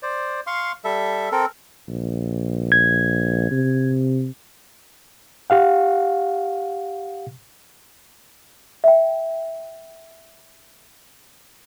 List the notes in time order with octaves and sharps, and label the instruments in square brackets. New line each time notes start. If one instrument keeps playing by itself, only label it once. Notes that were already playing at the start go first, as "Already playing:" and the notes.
[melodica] C5 D5
F5 C6 C#6
G3 A4 E5
C4 A4 A#4
[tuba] A#1
[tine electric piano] G#6
[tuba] C3
[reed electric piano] G4 F5 F#5
[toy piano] E5 G5